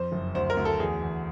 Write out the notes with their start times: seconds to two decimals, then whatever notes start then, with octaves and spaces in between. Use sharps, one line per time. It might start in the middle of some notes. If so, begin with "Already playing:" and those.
Already playing: F2 C5
0.12 F#1
0.35 D2 C5
0.50 A#4
0.57 D2
0.65 A4
0.80 E2 G#4
1.02 E2